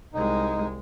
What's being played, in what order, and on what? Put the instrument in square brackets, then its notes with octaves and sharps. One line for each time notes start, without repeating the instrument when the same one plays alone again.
[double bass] C2 G#3 [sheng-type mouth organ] D#4